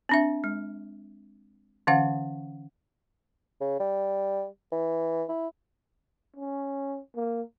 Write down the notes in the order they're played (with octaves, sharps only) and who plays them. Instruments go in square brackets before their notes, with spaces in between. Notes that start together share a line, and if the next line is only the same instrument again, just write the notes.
[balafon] C4 D4 E5
G#3
D3 E3 C#4 F5 F#5
[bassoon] C#3
G3
E3
E4
[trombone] C#4
A#3